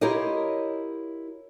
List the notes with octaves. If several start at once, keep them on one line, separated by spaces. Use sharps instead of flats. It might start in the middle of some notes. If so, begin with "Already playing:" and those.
E4 F4 G4 A#4 C#5 D#5